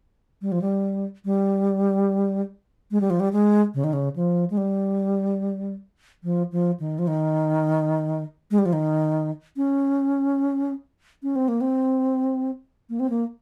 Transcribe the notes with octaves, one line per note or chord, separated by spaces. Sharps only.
G3
F3
G3
G3
G#3
G3
F3
G3
G#3
C#3
D#3
C#3
F3
G#3
G3
F3
F3
D#3
F3
D#3
G#3
G3
F3
D#3
C#4
C#4
C4
A#3
C4
A#3
C4
A#3